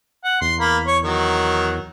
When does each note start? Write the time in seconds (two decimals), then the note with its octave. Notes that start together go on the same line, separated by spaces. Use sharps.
0.24 F#5
0.41 E2 C6
0.60 A#3 B5
0.87 C#5
1.04 D#3 F#3